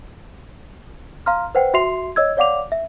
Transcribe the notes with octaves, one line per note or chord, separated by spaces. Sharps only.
F5 A#5 C6 F6
B4 C5 F#5 G5
F#4 E5 C6 C7 F7
C#5 D#5 E6 G#6
C#5 D5 F5 F#5 D6 F7
E5